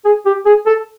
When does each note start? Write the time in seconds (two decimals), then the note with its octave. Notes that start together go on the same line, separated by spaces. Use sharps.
0.05 G#4
0.26 G4
0.46 G#4
0.67 A4